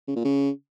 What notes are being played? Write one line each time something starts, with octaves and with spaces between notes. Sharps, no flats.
C#3
A#2
C#3